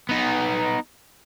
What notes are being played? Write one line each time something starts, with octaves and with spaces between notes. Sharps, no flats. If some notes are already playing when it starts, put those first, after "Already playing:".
B3 D#4